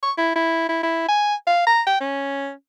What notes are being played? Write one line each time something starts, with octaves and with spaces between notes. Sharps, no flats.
C#6
E4
E4
E4
E4
G#5
F5
A#5
G5
C#4